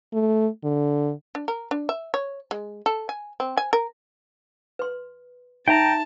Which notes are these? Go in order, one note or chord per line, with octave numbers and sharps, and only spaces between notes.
A3
D3
D4
A#4
D4
E5
C#5
G#3
A4
G#5
C4
G#5
A#4
B4 C6
D#4 E5 G5 A5 A#5